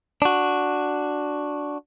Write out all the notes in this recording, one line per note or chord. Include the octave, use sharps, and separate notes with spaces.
D4 F#4